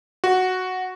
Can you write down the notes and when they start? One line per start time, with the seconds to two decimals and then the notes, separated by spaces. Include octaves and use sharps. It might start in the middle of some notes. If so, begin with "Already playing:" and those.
0.24 F#4